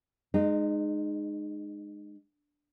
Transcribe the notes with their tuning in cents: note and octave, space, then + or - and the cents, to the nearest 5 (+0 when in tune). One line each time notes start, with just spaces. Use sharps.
G#3 +0 D#4 -30